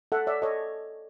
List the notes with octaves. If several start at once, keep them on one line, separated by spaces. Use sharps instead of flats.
A4 E5 F#5
C#5 D5 E5
A4 C#5 D#5